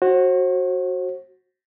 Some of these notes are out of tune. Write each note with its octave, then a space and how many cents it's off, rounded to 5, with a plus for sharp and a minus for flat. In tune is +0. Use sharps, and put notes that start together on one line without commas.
F#4 +0 C5 +40